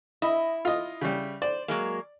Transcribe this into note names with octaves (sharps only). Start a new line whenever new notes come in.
E4 D#5
F4 D#5
C#3 G3
C5 D5
F#3 G#3 A#3